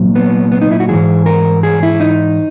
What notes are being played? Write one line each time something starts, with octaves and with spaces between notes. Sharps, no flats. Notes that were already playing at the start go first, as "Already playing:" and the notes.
Already playing: A#2 F#3
B3
B3
D#4
E4
F#4
G#2 E3 G#4
A#4
G#4
E4
D#4